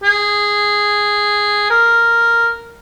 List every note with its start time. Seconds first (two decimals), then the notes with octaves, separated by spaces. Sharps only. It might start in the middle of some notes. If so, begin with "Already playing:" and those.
0.03 G#4
1.70 A#4